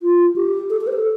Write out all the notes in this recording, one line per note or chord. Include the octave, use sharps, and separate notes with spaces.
F4
G4
A4
A4
C5
A4